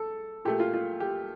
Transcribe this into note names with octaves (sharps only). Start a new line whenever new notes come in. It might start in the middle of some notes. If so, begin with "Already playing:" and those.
Already playing: A4
A#2 A3 G4
F4
F4
G4